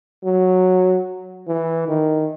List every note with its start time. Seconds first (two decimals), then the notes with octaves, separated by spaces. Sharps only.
0.24 F#3
1.48 E3
1.88 D#3